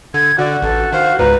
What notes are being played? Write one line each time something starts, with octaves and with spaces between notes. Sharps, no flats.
D3 G#6
D3 F#4 D5
A1 A4
D#3 C5 F5
C#2 G#2 B4 A#5